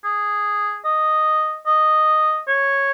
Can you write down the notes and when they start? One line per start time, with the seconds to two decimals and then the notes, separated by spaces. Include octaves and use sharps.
0.04 G#4
0.85 D#5
1.66 D#5
2.48 C#5